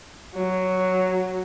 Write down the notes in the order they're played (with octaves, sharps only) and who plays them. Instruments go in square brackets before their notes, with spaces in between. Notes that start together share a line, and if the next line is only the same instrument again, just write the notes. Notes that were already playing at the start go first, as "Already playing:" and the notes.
[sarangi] F#3